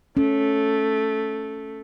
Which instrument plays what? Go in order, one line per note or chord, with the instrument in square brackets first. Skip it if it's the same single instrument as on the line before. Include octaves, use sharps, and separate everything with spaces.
[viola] A3 [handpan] C#4